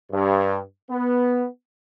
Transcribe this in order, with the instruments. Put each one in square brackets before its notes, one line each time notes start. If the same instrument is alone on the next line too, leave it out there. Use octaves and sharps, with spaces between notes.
[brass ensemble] G2
B3